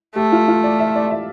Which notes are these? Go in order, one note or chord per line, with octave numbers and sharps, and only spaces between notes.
A3 G4
F4
F4
D5
E5
D5
E5